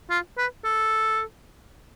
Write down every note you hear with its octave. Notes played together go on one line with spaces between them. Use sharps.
F4
B4
A4